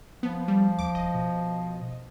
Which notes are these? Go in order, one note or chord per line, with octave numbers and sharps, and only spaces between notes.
F3 B3
G3
D#2 D6
F1 D#5
B2